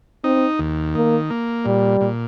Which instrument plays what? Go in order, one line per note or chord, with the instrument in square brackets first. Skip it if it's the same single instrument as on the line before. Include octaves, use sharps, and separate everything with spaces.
[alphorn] C4 [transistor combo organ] D#4
[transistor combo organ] D#2
[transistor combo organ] D#3 [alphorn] A#3
[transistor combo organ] A#3
[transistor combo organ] A#2 [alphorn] G3
[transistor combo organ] A#2